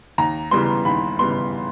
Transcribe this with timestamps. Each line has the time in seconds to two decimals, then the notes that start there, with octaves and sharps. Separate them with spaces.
0.18 D#2 A#5
0.51 C#3 E3 G3 B3 C6
0.85 D#2 B5
1.19 C#3 E3 G3 B3 C6